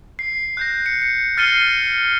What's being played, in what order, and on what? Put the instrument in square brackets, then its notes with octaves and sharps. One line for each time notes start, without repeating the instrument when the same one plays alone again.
[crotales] C7
F#6 G6 A#6
C#7
C#7
F6 A6 C7 C#7 D#7 G7